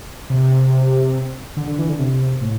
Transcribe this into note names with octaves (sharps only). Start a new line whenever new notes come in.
C3
D3
D3
E3
D3
C3
A2